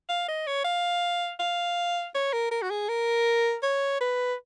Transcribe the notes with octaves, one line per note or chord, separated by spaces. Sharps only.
F5
D#5
C#5
F5
F5
C#5
A#4
A#4
F#4
G#4
A#4
C#5
B4